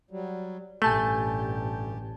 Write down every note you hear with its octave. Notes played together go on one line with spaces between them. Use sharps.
F#3 G3
A1 G2 B2 A3 G4 G#5 A5 G6